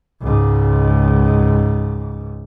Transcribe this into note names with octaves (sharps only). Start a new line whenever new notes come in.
C#2 G#2